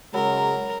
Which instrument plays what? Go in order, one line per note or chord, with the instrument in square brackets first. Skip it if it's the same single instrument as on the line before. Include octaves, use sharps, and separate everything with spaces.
[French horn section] C#3 G#3 [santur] F#3 B5 [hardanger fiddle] A#4